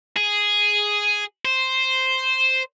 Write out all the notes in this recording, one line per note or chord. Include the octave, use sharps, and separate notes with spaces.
G#4
C5